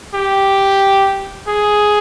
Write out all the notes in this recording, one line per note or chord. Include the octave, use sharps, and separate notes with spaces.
G4
G#4